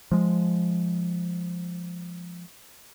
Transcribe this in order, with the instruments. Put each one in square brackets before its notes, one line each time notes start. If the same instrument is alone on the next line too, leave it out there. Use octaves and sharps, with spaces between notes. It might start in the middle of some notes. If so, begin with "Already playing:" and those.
[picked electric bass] F3 G#3